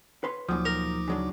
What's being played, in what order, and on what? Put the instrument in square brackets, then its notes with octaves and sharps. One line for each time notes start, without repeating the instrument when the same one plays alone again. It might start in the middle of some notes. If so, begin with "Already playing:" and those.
[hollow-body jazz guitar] B4 C#5 C6
[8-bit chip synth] D2 D#4 D6 [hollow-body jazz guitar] A#2 F#3 [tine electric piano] F3 D#6
[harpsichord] A#4
[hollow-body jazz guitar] C#3 F#3 D4